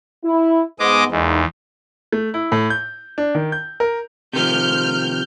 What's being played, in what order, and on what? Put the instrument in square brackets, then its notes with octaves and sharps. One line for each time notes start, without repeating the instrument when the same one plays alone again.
[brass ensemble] E4
[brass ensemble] G#2 B3 [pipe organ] G#3 D#5 D6
[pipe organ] E2 [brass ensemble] G#3 A#3 D#4
[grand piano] A3
E4
A2
G6
D4
D#3
G6
A#4
[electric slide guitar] C3 D#3 F3 [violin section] F6 G6